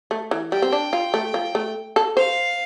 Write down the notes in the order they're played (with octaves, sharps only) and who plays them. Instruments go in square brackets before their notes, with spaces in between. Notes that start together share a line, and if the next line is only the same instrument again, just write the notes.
[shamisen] A3
E3
[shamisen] G3 [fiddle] G5
[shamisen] C4
D4
F4
A3
F3
A3
A4
[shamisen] C5 [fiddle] F5